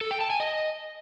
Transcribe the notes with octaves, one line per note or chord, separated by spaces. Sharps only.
A4
G5
A5
G#5
D#5